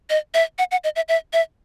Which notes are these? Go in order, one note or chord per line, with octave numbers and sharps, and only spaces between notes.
D#5
E5
F#5
F#5
D#5
E5
E5
E5